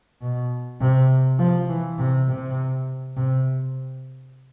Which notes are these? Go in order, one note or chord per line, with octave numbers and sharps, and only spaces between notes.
B2
C3
F3
E3
C3
C3
C3